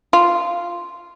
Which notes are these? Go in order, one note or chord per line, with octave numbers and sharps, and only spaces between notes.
F4